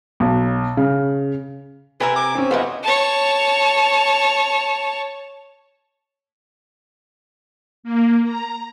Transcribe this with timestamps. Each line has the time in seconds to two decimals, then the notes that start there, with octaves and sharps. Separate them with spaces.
0.20 B1
0.77 C#3
2.00 C3 A#4 B4 E5 G#5
2.16 D6
2.35 C4 C#4
2.51 F#3 G3 B3 E4 F4 D#5 F#5
2.84 C#5 A5
7.83 A#3
8.23 A#5